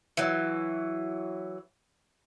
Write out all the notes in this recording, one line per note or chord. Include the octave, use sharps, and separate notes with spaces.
E3 F#3